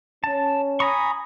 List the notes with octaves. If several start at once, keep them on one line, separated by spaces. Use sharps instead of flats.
C#4 A5
G#5 A#5 B5 C#6 D#6